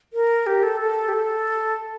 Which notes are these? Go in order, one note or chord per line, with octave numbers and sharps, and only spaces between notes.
A#4
G4
A4
A4
G4
A4